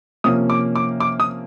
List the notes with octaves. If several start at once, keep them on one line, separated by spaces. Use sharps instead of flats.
C3 F3 A#3 C#4 D#6
D6
D6
D6
D#6